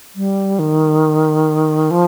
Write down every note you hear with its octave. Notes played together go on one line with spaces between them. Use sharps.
G3
D#3
F3